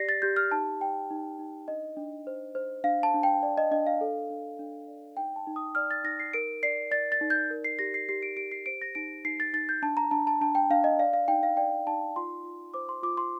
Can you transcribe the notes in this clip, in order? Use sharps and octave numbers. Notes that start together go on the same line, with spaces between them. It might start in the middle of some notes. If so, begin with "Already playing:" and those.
Already playing: G4 D5 A#6 C7
A6
G4 G6
F6
D#4 A5
D5 G5
D#4
D#4
D4 D#5
D4
C5
C5
D4 F5
A5
D4
G5
D5
D#5
D4 D#5
F5
A4
D4
D4
D5
D#4 G5
A5
D#4
D#6
D5 F6
A6
D#4 A#6
C7
A#4 D7
D5 C7
D5 A6
A6
D#4
G6
A#4
C7
G4 A#6
C7
G4 C7
D7
G4 D7
C7
C5 D7
A#6
D#4 D7
D#4 C7
A6
D#4 A6
G6
D4 A5
A#5
D4 A5
A5
D4 A5
G5
D4 F5
D#5
D5 F5
F5
D#4 G5
F5
D5 G5
D#4 A5
F4 C6
F4
C5 D6
C6
F4 D6
C6